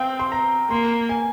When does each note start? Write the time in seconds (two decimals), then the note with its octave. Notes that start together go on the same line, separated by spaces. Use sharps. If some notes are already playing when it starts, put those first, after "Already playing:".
Already playing: C4 F5 G5
0.19 C6
0.32 A#5
0.70 A#3 C6
1.09 G#5